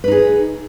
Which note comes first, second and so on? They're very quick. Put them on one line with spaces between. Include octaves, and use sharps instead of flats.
B4 D#4 G#4